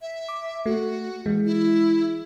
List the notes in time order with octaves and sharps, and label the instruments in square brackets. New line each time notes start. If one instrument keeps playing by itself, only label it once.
[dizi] E5
[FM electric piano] D6
[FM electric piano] A3 [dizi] F#4
[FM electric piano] E3 G#3
[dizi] E4